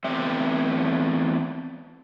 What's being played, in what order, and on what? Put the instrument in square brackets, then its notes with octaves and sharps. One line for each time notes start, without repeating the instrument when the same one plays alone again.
[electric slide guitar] E2 A3 C4 E5